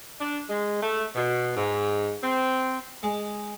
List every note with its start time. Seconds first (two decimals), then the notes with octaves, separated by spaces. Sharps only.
0.20 D4
0.49 G#3
0.82 A3
1.15 B2
1.57 G#2
2.23 C4
3.03 G#3